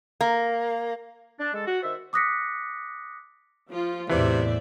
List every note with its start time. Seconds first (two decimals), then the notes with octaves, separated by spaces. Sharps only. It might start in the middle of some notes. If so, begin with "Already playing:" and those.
0.21 A#3
1.40 D4
1.54 G#3 A4
1.66 F#4
1.83 D#3 C5 E5
2.13 D6 D#6 F#6 A#6 B6 C#7
3.69 F3 F4
4.10 E2 A2 C3 E3 C5 D5 E5